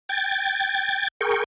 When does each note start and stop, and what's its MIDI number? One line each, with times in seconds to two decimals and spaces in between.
0.09 1.08 79
0.09 1.08 92
0.09 1.08 93
1.21 1.44 68
1.21 1.44 70
1.21 1.44 79
1.21 1.44 85